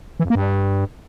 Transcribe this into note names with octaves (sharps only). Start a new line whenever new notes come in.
E3
F2
A#3
G2